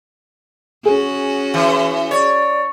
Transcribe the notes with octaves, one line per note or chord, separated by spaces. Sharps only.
C#4 F#4 G#4
E3
C#5 D5